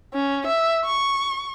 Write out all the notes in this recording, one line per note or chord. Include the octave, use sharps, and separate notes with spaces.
C#4
E5
C#6